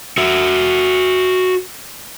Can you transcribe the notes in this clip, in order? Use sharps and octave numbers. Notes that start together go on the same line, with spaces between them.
F#4 E5